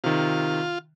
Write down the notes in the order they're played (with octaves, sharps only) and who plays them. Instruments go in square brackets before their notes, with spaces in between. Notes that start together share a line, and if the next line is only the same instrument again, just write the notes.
[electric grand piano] C3 D#3 [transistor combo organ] F4